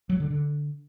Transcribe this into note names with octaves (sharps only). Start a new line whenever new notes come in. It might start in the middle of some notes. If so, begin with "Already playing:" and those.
F#3
D3
D3